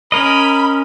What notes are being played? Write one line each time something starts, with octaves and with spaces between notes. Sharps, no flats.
C#4 A#4 D#5 B5